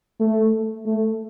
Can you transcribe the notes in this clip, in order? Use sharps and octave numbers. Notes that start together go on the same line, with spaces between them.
A3
A3